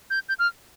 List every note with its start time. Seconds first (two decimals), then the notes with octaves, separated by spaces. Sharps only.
0.10 G6
0.29 G6
0.39 F6